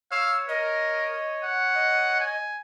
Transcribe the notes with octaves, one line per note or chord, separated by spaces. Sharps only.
C#5 F5 E6
A#4 D#5
F#5
D#5
G#5